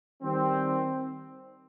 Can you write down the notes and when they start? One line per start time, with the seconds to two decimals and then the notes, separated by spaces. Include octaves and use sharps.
0.23 D#3 G3 C4